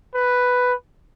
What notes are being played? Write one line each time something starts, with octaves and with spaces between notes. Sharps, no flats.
B4